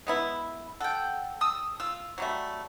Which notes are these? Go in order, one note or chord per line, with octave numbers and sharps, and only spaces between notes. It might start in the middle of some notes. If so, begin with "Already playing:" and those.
G#3 B3 E4
A4 F#5 G5
A5 D#6 E6
F4 E6
F#3 G3 A3